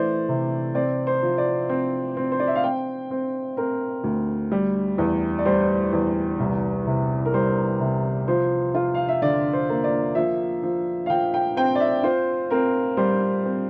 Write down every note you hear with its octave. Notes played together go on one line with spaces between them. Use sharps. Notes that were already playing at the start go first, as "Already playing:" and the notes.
Already playing: E3 A3 C5 D5
C3
C4 D5
C5
F3
D5
C4
C4
C5
D5
E5
F5
C4 G5
C4
C4 A#4
D2
G3
E2
D5
G3 C5
E2
C2
C3
A#4
G3 C5
C3
F3 C5
F4
F5
E5
D3 D5
C5
A#3
D5
F3 E5
F3
F5
F3 G5
G5
C4 G5
D5
E5
F4 C5
C4 A#4
G3 C5
C4